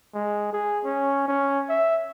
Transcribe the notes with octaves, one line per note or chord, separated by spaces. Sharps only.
G#3
G#4
C#4
C#4
E5